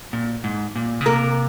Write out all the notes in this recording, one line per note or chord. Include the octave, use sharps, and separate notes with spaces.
A#2
G#2
A#2
C#3
C3 A#3 A#4